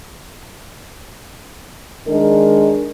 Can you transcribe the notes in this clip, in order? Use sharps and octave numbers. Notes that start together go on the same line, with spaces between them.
D#3 G#3 D4 A#4